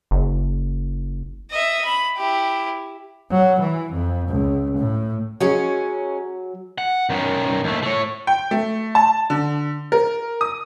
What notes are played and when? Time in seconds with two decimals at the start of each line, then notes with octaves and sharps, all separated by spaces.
0.11 F#1
1.51 D#5 E5
1.85 B5
2.17 E4 G4
3.31 F#3
3.61 E3
3.94 F2
4.29 C#2
4.78 A2
5.41 F#3 G#3 C#4
6.78 F#5
7.10 F#2 D#3
7.64 D#2 A3
7.83 A3 C#5
8.27 G5
8.51 A3
8.95 A5
9.30 D3
9.92 A#4
10.41 D#6